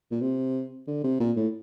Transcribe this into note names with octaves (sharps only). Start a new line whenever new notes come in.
A#2
C3
D3
C3
A#2
A2